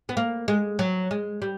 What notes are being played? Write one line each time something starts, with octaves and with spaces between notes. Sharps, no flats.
B3
A#3
G#3
F#3
G#3
G3